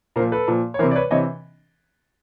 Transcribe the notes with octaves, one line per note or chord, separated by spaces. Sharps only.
A#2 F3 A#4 C5
A4 B4
A#2 F3
C#5
C3 E3 A#4 C5
D5
B4 C#5
C3 E3 C#5 D#5